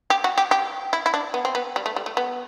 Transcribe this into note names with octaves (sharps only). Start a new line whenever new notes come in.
G4
F#4
G4
G4
E4
E4
D4
B3
C4
B3
G3
A3
G3
A3
B3